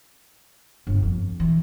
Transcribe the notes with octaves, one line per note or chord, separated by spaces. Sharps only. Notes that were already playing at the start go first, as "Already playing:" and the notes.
G1
F2
E3